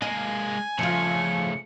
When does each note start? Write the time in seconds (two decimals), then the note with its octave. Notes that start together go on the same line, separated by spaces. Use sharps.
0.02 G#3 A#3 D#5 G#5
0.79 C#3 F3 A3 F4 C#7